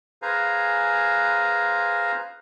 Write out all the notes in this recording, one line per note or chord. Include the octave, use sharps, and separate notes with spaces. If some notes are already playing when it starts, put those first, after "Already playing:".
G#4 B4 C5 F5 G#5 A#5